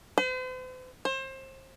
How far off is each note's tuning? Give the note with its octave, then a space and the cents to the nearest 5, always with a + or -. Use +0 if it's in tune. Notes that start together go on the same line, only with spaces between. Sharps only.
C5 -45
C5 +30